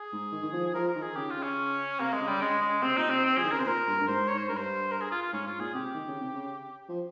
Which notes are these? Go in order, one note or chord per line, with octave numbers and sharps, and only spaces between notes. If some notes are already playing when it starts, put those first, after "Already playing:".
Already playing: G#4
G#2
D#3
D#3
F3
F3 A#4
A#4
D#3
G#4
C#3 G4
F4
C#3
C#4
C3 A#3
G#3
C#3
G3
C#3 G#3
C#3 G#3
C3 C4
A#2 D#4
C3 C4
C4
F3 G#4
D#3
C#3 A#4
C3 C5
A#2 A#4
G2
G2
G#2 C5
C#5
C5
G2 A#4
C5
A#4
G#4
F4
F4
G#2 C#4
G#2 F4
A#2 G#4
C3 G4
D#3
C#3
C3
C#3
F3